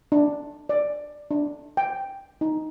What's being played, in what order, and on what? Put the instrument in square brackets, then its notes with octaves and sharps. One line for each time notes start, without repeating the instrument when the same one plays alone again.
[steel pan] D4
D5
D4
G5
D#4